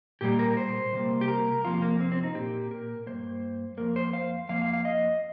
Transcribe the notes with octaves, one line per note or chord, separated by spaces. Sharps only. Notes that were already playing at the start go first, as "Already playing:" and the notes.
A#2 G3 A#3 G4
A#4
C5
C3 G3 A#3
G4
A#4
F2 C3 F3 A#3 F4
A#3
C4
C4
D#4
A#2 A#3 G4
A#4
G2 D#3 A#3 C5
F2 D#3 A#3 A#4
C5
F5
F2 F3 A#3 F5
F5
F5
D#5